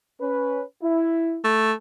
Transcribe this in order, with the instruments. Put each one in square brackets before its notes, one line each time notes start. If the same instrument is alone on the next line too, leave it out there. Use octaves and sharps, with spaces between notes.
[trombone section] C#4 B4
E4
[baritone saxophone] A3